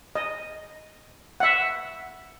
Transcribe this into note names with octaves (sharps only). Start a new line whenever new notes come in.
D#5
E5 F#5